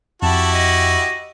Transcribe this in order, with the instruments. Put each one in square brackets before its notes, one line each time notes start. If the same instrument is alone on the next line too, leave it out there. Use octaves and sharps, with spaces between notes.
[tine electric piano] F2 [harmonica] E4 F#4 G4 [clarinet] A5
[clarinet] D#5